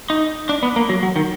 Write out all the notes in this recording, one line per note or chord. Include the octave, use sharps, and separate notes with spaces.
D#4
D4
B3
A#3
F#3
F#3
D#3